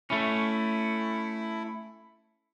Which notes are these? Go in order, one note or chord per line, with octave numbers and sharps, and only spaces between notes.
A3 C#4 E4